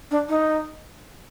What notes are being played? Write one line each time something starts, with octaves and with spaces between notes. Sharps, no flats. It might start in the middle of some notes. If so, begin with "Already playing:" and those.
D4
D#4